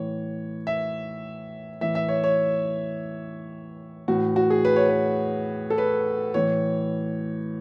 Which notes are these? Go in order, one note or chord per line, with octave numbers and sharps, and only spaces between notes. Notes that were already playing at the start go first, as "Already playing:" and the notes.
Already playing: A2 E3 C#5
E5
A2 E3 E5
E5
C#5
C#5
A2 E3 F#4
F#4
G#4
B4
C#5
B4
A4
B4
A2 E3 C#5